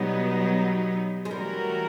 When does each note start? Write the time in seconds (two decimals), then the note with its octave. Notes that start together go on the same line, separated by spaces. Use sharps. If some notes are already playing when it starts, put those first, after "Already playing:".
Already playing: B2 F#3 G3 B3 D#4
1.25 G#3
1.31 E3 G3 A3 C#4 F#4 A#4